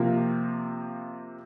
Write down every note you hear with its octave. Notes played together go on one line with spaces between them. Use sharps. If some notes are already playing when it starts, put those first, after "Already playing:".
Already playing: C3 F3 A#3